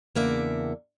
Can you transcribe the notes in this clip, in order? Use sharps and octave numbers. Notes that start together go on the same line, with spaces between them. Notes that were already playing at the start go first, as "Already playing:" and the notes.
E2 C#3 A#3 D4 E5 F#5